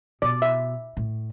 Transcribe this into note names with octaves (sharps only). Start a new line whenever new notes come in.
B2 D5
E5
A2